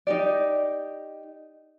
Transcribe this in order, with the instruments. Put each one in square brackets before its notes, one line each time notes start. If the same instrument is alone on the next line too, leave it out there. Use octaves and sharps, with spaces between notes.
[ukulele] D#4 G4 D5